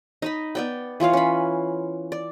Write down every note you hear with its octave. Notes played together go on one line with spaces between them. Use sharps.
D#4 D#5 B5
B3 D5 G5
E3 F4 C#5 F5
C#4 B5
D5